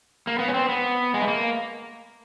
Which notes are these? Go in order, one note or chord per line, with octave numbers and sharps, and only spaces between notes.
A#3
B3
C#4
C4
B3
G#3
A3
A#3